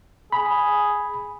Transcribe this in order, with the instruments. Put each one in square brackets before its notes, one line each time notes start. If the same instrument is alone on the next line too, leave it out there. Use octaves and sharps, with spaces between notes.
[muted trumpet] G#4 [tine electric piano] B5